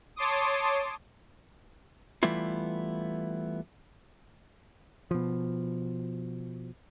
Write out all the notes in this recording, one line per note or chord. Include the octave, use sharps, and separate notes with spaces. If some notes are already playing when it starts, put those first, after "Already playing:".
C#5 A5 C6 D6 D#6
E3 G3 A3 B3 E4 F4
B2 F3